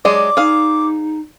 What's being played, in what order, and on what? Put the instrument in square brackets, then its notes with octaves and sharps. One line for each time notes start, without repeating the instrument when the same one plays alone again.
[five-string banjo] F#3 G#3 G#4 [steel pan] D5 [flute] D6
[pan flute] D#4 [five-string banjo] G#4 F5